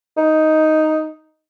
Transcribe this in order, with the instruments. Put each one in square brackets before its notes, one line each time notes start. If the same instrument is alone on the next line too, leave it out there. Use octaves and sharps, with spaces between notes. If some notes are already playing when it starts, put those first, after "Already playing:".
[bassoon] D#4